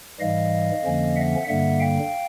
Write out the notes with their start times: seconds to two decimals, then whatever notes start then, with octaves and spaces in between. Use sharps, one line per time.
0.20 G#2 E3 G3 D#5 F5
0.84 F2 D3 F3 A#3 C#4
1.16 E5 F#5
1.48 G2 D3 G3 A#3 E5 F#5
1.80 F5 G5